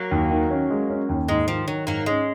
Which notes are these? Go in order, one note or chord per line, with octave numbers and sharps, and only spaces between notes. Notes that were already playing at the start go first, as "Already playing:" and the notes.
Already playing: F#3 A#3
D#2
D#3
C#4
G#3
C#4
D#2
G#2 G#3
D#3 F3
D#3 F#3
G#2 F#3 A#3
G#3 C#4